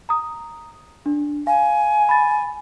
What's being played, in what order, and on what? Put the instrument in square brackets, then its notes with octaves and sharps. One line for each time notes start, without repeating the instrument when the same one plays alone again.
[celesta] A#5 D#6
D4
[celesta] F5 [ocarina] G#5
[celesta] B5 A6